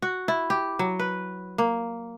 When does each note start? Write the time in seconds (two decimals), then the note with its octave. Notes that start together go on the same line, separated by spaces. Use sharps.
0.02 F#4
0.28 E4
0.50 G4
0.79 F#3
0.99 B4
1.58 A#3